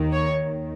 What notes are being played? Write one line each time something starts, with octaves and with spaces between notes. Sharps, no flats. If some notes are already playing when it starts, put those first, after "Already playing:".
Already playing: D#2 D#3
C#5